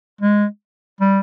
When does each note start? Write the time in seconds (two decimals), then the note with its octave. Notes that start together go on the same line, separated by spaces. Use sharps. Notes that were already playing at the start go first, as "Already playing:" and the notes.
0.21 G#3
1.01 G3